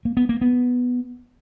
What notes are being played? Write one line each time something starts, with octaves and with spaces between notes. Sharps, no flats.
A#3
B3
A#3
B3